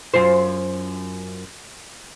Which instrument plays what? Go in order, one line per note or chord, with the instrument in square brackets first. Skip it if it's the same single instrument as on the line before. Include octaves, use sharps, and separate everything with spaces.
[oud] F#2 F4 C5